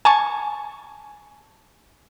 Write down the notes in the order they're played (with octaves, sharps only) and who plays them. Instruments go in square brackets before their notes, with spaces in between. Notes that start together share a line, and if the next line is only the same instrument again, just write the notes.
[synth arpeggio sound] G#5 A5 C#6